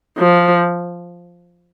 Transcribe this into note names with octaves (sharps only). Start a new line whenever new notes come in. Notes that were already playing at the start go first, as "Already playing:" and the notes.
F3